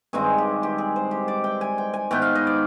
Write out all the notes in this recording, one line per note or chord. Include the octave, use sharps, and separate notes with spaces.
G2 D#3 G#3 C4 G#4
G4
G4
G#4
C5
G4
D5
G5
G#5
G5
G#5
G#2 D#3 B3 G5
F5
D#5
D5